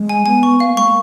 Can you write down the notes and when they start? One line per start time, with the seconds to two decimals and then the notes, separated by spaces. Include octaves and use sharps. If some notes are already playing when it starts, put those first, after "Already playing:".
Already playing: G#3
0.09 G#5
0.26 B3 G#5
0.43 C#6
0.60 B3 F5
0.68 A#3
0.76 G#3 C#6
0.85 A#3